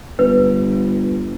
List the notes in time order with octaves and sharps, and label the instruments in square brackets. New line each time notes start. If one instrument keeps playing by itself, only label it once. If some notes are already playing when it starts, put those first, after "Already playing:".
[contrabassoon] G1 [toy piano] B4